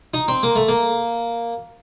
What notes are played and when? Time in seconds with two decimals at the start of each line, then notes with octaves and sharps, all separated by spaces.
0.14 D#4
0.28 C4
0.43 A#3
0.56 A3
0.68 A#3